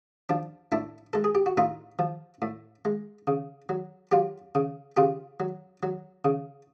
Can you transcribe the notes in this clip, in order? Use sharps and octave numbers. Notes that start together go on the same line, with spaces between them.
F3 D4
A2 D4 E4
G#3 A4
G#4
G4
F#4
A2 D#4 F4
F3
A2
G#3
C#3
F#3
F#3 F4 G4
C#3
C#3 F4 G4
F#3
F#3
C#3